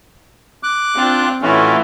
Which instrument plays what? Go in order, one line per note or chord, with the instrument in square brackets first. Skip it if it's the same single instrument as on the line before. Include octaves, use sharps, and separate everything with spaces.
[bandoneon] D6 F#6
[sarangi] C4 [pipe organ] D4 F4
[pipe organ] A2 F4 F#4 [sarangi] E3 [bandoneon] A3 C#4